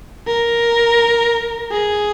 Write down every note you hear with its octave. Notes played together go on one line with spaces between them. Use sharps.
A#4
G#4